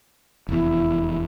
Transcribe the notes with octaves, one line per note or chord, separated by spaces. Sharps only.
F1 E2 E4